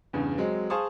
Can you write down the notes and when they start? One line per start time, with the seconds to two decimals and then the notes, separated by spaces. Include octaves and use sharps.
0.13 E2 G2 C#3
0.38 F#3 G#3 C4
0.70 G#4 C5 F5 A5 C#6 D#6